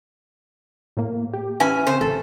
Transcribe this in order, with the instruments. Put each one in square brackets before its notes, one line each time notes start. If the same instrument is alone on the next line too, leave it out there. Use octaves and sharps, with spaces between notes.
[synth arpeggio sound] A2 A#3
G4
[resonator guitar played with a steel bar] E3 C#4 G#5 [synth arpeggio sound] B4
[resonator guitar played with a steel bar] C#3 C5 [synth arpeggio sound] C4
[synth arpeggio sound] A1 [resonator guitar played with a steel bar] A4